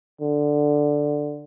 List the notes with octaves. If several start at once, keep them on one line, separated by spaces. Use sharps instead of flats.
D3